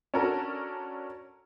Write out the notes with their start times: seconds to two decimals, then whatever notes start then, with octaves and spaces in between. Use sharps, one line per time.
0.14 C#4 D4 F#4 A4 A#4